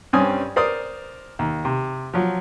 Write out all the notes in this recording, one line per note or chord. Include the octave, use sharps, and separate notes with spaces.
G2 G3 C4 C#4 G#5 D#6
A#4 C5 D5 D#6
D#2
C3
F3 F#3